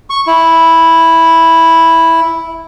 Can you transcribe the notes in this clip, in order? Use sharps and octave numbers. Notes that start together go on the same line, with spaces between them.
C#6
E4